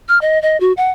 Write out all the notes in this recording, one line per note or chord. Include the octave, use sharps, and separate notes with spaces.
F6
D#5
D#5
F#4
F#5